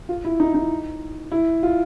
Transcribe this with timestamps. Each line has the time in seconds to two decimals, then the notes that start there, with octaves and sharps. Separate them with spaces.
0.09 F4
0.25 E4
0.40 D#4
0.54 D#4
1.32 E4
1.63 F4